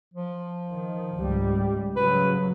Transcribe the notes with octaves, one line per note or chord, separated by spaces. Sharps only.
F3
D#3
C#2 G#2 G3
C#3 F#3 B4